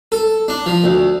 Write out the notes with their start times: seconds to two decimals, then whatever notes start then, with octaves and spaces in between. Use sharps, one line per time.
0.12 A4
0.48 D4
0.66 F3
0.84 D2